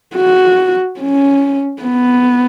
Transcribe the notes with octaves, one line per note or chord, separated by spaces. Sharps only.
F#4
C#4
B3